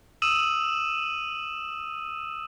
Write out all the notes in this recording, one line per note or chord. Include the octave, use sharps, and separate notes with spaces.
D#6 E6 D#7 E7 F#7